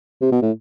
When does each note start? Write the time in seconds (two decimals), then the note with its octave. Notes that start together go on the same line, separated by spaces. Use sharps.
0.22 C3
0.32 B2
0.42 A2